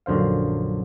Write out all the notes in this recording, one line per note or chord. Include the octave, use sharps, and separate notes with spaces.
A#1 F#2 D3 C5 F5